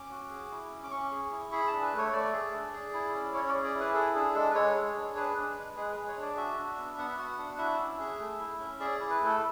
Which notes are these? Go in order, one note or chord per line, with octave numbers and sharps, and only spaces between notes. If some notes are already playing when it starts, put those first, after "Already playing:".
Already playing: C#4 D6
F#4
G#4
E4
C#4
D6
C#4 C#6
G#4
E4
G#4 B5
D4 A5
B4
A3
C#5
A3 D5
G#4
D4
G#4
E4
C#4
C#4 C#5
G#4 D5
D5
E4
B4
G#4 A4
D4 G#4
G#3 A4
B4
G#3 C#5
G#4
D4
G#4 B4
D4
G#3
G#3 G#4
B4
G#4
C#5
D4
D5
F#4 E5
D4
B3
B3 F#5
E5
F#4 F#5
D4
E4 E5
C#4
G#4
A3
E4
C#4
G#4 D5
E4
B4
A3 A4